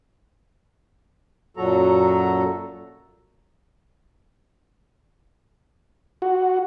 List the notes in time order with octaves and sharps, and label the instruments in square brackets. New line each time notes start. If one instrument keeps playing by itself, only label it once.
[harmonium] F#2 A#2 F#3 F#4 A4 A#5
[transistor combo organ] F#4